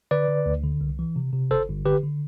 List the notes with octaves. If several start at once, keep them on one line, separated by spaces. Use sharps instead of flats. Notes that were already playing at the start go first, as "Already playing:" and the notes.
D3 B4 D5
D3
D2
D3
C2
E3
C3
C3
G1 A4 C5
G1
D3 G4 B4
D3